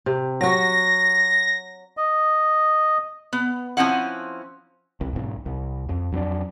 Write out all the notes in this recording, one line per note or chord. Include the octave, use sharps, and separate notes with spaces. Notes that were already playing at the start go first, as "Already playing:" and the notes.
C3
F#3 F#4 A#6
D#5
B3
F3 A3 C4 C#4 E4 F#5
C2
B1 G#2
C2
F2
F2 F#3 C#4 D4